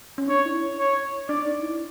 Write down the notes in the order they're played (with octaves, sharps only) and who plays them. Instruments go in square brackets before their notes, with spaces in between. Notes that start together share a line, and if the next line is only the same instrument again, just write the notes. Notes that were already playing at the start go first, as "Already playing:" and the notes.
[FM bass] C#4
[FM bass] D4 [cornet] C#5
[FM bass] E4
[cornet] C#5
[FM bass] D4 [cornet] D5
[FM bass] D#4
E4